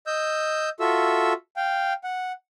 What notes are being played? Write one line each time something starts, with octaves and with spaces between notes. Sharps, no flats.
D#5 E6 G6
F4 F#4 A4 E5 E6
F5 G5
F#5